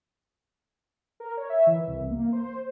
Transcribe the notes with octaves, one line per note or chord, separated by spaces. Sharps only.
A#4
C#5
E5
E3
C2
A#3
C5